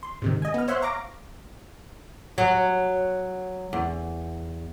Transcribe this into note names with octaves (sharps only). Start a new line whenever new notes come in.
C6
G#2 C3 D#3
D#5 G#5
B3 F6
C5 C#5 E5 F#5 C6 F#6
F5 A#5 C#6 D6 A#6
F#3
E2